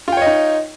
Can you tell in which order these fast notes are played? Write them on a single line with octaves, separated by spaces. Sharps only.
F4 G5 C#5 D#5 D#4